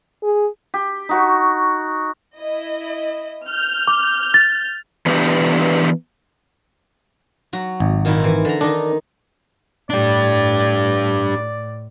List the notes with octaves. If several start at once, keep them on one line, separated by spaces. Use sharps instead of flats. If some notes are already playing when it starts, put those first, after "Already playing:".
G#4
G4
D#4 F#4 C#6
E4 D#5
F6 G6
D6
A6
E3 B3 D4 G4
F#3 F#4
G#1
A#2 D#3 E4
E3 C4
D3 A#5
D#3 D4 D#4
A2 D4 G4 D5